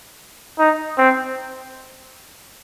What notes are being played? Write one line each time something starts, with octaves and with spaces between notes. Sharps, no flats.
D#4
C4